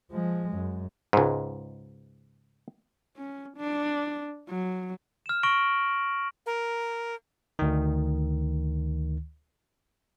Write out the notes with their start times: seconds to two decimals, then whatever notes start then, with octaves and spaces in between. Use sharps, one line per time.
0.11 F3 G#3
0.55 F#2
1.13 C#2 G#2
3.17 C#4
3.57 D4
4.49 F#3
5.26 F6 E7
5.43 C#6 A#6 D7 F#7
6.46 A#4
7.59 D2 D#3